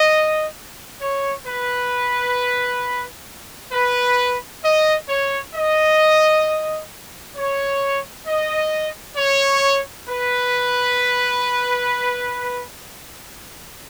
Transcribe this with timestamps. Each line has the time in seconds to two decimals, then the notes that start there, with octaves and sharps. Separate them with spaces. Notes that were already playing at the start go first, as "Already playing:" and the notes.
Already playing: D#5
1.01 C#5
1.46 B4
3.72 B4
4.64 D#5
5.09 C#5
5.55 D#5
7.35 C#5
8.26 D#5
9.17 C#5
10.08 B4